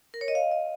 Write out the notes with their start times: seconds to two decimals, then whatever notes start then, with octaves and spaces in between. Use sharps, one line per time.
0.14 A#4
0.21 C#5
0.28 D#5
0.35 F5
0.51 D#5